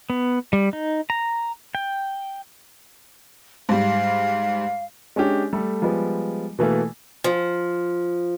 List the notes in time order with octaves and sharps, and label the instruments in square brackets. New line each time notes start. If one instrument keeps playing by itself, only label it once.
[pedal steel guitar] B3
G3
D#4
A#5
G5
[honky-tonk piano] G#2 G3 [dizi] F5
[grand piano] G#3 C#4 D4 G4
G3 A3 A4
F3 G3 G#3 B3
B2 E3 A3 A#3
[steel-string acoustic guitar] F3